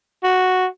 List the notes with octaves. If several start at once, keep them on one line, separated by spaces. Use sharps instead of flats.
F#4